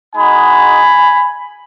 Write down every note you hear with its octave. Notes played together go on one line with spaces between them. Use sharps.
G#3 D#4 F#4 G#5 B5